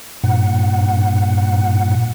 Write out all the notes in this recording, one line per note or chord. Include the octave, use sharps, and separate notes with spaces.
G2 A#2 F#5